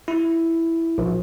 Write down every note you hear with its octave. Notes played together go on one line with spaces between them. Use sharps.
E4
A#1